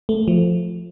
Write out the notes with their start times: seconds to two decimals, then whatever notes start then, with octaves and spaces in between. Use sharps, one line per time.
0.09 A3
0.28 F3